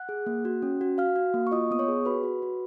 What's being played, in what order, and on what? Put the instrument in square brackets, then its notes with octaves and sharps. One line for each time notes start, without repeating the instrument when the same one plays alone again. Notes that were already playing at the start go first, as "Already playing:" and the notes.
Already playing: [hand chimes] F#5 F#6
G#4
A#3
F#4
C#4
F#4
F#4 F5 F6
F#4
A#3
C#6
F4 D#5 D#6
B3 D#6
C#5 C#6
G#4
F#4 B4 B5
F#4
F#4